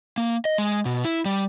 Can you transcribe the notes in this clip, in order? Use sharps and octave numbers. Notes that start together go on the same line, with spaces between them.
A#3
D#5
G#3
B2
E4
G3